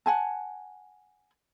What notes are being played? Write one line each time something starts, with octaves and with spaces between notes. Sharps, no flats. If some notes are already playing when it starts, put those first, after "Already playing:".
F#5 G#5 A5